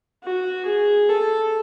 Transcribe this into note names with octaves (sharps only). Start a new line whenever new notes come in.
F#4
G#4
A4